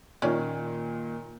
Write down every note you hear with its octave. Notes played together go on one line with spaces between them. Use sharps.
A#2 D#3 C#4 E4 D5